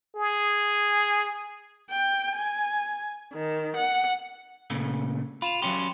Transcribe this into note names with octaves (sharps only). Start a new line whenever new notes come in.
G#4
G5
G#5
D#3
F#5
A#2 C#3 A3
F4 B5 E7 F7
F#3 C#4 G4 C6